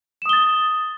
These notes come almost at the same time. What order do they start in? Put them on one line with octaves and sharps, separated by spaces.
E7 D#6 G7 A6